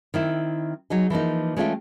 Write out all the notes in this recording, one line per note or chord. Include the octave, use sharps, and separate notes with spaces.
D#3 C4 E4
F#3 D#4 G#4
E3 F3 A#3 D#4
G#3 A3 C#4 F4 E5 G5